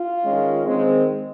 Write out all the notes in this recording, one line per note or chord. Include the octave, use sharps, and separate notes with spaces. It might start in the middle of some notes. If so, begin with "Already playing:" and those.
Already playing: F4
D#3 G#3 C#4
D#3 G#3 C4